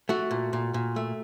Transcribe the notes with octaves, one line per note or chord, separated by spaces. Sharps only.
A3 F#4
A#2
A#2
A#2
A3